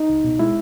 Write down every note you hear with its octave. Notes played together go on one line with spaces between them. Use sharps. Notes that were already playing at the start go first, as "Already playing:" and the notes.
Already playing: D#4
C#2
B2
G#3 E4